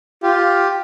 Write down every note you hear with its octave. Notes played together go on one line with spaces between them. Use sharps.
F4 G4